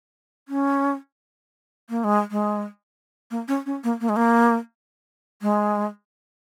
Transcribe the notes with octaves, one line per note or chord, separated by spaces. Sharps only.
C#4
A#3
G#3
G#3
A#3
C#4
C#4
A#3
A#3
G#3
A#3
G#3